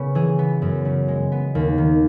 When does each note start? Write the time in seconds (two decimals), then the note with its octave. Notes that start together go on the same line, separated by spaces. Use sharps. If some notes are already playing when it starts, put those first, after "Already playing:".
Already playing: C#3 B3 B4 C#5
0.15 E3 G#4
0.39 B3
0.62 F#2
0.85 C#3
1.08 G#3
1.32 B3
1.55 D#2
1.78 D#3